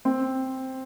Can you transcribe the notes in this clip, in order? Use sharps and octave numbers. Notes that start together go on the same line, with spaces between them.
C4